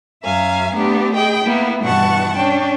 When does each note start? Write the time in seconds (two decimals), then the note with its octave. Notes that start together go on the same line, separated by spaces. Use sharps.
0.23 F#2 E5 F5 G#5 A#5
0.73 A3 B3 D4 G4
1.14 G#4 D#5 G5 B5
1.44 A#3 B3 E4
1.83 G2 B2 E3 F#5 A5 C#6
2.35 C#4 D4 G5